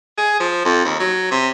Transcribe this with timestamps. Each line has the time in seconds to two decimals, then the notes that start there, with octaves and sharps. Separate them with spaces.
0.18 G#4
0.40 F3
0.65 F2
0.85 D#2
1.00 F#3
1.31 C3